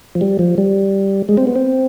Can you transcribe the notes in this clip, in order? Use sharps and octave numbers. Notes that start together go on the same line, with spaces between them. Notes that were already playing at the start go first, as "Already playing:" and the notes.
F3
G3
F3
G3
G#3
C4
B3
C4